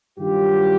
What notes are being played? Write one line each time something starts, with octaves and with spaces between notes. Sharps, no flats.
G2 D#3 F#3 F4 G4